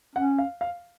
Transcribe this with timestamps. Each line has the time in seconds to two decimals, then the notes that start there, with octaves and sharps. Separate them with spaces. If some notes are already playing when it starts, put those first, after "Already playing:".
0.16 C#4 F#5
0.38 F5
0.61 F5